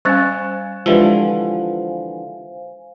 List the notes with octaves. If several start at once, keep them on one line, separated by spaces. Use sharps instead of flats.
G3 C#4 C5 F5 G#5 C#6 F#6 A6
D3 E3 F3 G#3 F4 G4 B4